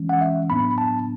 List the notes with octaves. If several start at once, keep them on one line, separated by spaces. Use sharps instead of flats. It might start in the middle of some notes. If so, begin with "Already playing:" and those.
Already playing: E3 G#3 C#4
F#5
E5
A2 F#3 B3 D4 B5
A5